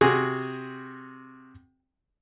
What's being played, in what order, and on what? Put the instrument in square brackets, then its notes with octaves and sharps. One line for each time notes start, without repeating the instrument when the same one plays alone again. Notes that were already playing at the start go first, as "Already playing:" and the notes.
[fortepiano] C3 F#4 G#4